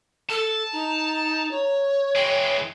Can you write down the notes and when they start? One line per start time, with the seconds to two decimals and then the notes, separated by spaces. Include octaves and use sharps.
0.30 A4 A5
0.73 D#4 A#5
1.51 C#5
2.16 E3 G#3 G5